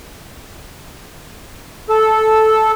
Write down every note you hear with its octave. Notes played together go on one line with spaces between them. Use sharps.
A4